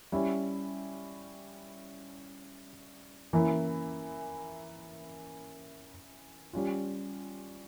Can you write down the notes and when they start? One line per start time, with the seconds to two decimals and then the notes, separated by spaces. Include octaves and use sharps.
0.12 G3 C#4 E4
3.33 E3 A#3 C#4 E4
6.53 G3 C#4 F4